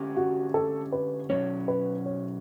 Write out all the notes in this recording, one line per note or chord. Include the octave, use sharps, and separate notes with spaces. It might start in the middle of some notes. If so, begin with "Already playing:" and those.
Already playing: D3 A3 C#4 G4
F#4
A4
B4
B2 F#3 C#4 C#5
B4
C#5